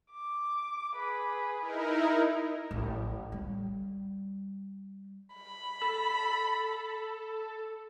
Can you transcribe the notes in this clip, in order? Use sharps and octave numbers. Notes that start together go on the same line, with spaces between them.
D6
G#4 B4
D#4 E4 A#4
A1
G3
B5
A4